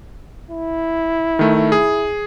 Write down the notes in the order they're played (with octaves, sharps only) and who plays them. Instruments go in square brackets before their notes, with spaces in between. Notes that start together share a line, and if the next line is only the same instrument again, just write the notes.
[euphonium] E4
[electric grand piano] D#3 A3
G#4